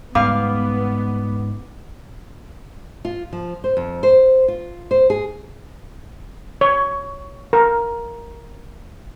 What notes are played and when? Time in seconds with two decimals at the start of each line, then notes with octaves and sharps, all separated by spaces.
0.15 G#2 C#3 G3 G#3 B3 F5 D6
3.05 F4
3.33 F3
3.64 C5
3.77 F2
4.03 C5
4.48 F4
4.91 C5
5.10 G#4
6.61 C#5
7.53 A#4